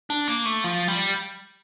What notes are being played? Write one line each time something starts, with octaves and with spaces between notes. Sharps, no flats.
D4
A#3
A3
F3
G3